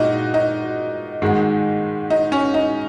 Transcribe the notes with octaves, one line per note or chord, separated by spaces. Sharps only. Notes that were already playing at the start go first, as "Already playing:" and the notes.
Already playing: A#2 G#3 D#4 F#4
D#4
G#2 D#3 G#3 F#4
D#4
C#4
D#4